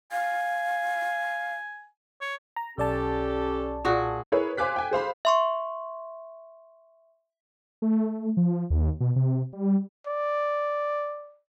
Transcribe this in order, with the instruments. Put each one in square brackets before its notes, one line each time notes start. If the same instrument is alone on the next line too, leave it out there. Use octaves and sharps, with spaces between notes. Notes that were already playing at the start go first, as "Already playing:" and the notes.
[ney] F5 [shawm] G#5
[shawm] C#5
[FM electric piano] A#5
[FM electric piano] B1 D5 A5 [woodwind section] C#4 G4 A4
[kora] A#2 F#4 G#4
[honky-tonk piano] E4 G#4 A#4 B4 C#5
C5 F5 G#5 D6 F#6 B6
G5 G#5
G#4 C5 F5 B5
[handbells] E5 C6 C#6
[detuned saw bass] A3
F3
D#2
B2
C3
G3
[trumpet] D5